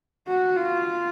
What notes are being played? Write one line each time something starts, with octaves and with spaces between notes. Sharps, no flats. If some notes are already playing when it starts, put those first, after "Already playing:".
F#4
F4